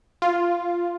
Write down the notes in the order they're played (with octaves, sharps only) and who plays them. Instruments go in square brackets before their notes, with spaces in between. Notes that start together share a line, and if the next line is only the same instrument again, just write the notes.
[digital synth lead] F4